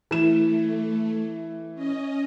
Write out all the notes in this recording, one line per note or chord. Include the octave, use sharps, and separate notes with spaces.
E3 A3 E7
C#4 D#5